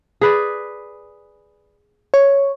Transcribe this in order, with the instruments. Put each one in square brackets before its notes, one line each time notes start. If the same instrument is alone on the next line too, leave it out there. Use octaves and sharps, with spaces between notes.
[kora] G#4 B4 D5
[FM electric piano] C#5